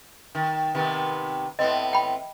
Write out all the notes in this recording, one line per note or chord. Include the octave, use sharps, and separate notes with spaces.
D#3
C3 D#3 B3
A2 B3 C4 D#5
G5 B5